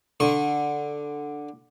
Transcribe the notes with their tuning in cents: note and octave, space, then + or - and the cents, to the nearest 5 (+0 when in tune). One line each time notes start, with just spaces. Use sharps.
D3 +0 C#6 -25